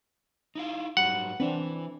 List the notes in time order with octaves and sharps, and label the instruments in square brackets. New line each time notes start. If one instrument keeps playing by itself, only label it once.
[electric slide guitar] D#4 E4 F5
[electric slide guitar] G#2 F#3 G3 [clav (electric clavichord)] F#5
[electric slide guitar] E3 B4 [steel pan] C4 D4